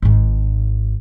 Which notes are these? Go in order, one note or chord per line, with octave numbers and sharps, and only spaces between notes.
G#1 G#2